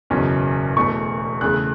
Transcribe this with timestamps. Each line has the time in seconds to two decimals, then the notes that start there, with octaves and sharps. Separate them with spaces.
0.10 F#1 E2 B2 F#3 C#4
0.77 E1 E2 B2 A3 C#6
1.41 E2 C#3 A3 F#6